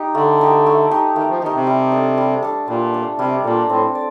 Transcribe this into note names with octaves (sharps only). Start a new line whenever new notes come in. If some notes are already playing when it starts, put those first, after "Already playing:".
Already playing: D#4 G4
D3 A3
D#4 G4
A3
D#4 G4
D#3 A3
F3
D#3 D#4 G4
C3
G3
D4 A4
G3
D4 A4
A#2 G3
D4 A4
C3 G3
A#2 D4 A4
A2 C4
D5